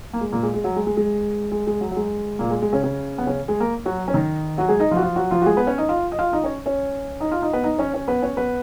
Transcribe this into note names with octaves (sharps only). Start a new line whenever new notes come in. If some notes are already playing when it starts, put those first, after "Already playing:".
A#3
G#3
A#2 A#3
G#3
G#3
F#3
G#3
G#3
G#3
G#3
G#3
F#3
F#3
G#3
A#2 A#3
G#3
G#3
C#3 C#4
C#3 C#4
B3
C#3 C#4
G#3 G#4
A#3 A#4
F#3 F#4
C#4
D#3 D#4
F#3 F#4
G#3 G#4
D#4 D#5
F3 F4
F#4
F3 F4
F#3 F#4
F3 F4
F#4
G#3 G#4
B3 B4
C#4 C#5
D#4 D#5
F4 F5
D#5
F4 F5
D#4 D#5
C#4 C#5
C#4 C#5
D#4 D#5
F4 F5
D#4 D#5
B3 B4
D#4 D#5
C#4 C#5
C#4 C#5
B3 B4
C#4 C#5
B3 B4